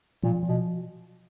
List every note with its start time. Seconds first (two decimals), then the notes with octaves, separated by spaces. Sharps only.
0.23 A#2 F3
0.43 F3
0.49 B2